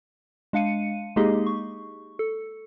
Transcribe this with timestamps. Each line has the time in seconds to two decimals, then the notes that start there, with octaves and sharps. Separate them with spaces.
0.53 G#3 D4 F5 C#7 D#7
1.16 G#3 A#3 D#4 G4 G#4 D#5
1.46 C#6
2.19 A4